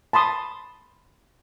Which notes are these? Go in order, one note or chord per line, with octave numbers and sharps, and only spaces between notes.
A5 B5 C6 D#6